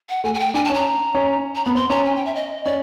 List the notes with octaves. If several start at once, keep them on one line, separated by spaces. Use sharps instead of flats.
F#5
A3 G#5
G#5
G5
D4 G#5
A5
C#4 A#5
C#4
A#5
B3 B5
C4 C6
C#4 A#5
G#5
G5
E5
D#5
C#4 D5